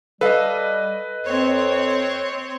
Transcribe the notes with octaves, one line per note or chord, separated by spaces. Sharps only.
G3 A4 B4 D#5 F5
F2 C4 C#5